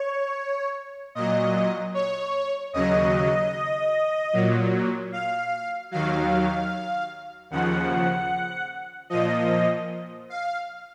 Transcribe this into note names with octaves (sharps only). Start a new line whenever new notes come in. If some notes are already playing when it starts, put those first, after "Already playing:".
Already playing: C#5
A#2 F#3 D#5
C#5
D#2 C#3 F#3 D#5
A#2 F#3
F5
D#2 D#3 F#3 F5
D#2 C#3 F3 F#5
A#2 F3 D#5
F5